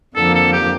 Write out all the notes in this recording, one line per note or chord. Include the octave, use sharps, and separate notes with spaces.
F2 D3 F3 A#3 A4
A4
G4